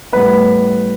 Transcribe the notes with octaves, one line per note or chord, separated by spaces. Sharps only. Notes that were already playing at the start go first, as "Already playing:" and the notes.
A2 G3 B3 B4